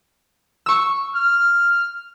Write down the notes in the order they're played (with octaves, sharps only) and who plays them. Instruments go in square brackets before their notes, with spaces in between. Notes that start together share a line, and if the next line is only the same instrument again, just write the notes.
[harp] C#6 E6
[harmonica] F6